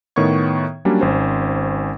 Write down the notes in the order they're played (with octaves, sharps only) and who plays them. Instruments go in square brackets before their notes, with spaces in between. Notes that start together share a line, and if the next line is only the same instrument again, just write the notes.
[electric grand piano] A2 D#3 B3 C#5 C#6 G#6
F#3 G3 A#3 C#4 D4
G#1 C#4 C5